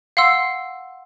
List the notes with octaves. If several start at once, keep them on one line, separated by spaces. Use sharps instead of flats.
F5 F#5 C6 E6